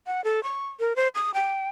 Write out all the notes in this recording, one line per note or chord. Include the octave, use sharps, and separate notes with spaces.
F#5
A4
C#6
A#4
C5
D#6
G5